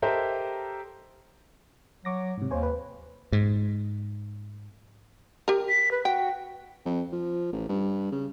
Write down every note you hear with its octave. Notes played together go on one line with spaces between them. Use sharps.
G4 A4 A#4 C5 D#5 E5
F#3 C#6 D6 A#6
G#2 C3
D#2 C5 C#5 G#5
B4
G#2
G4 A#4
B6
B4
F#4 G5
F2
F3
A1
G2
C#3